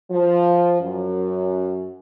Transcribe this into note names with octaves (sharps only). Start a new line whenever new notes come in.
F3
F#2